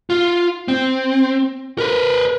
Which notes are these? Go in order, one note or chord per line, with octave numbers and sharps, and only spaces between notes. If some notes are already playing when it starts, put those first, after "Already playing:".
F4
C4
A#4 B4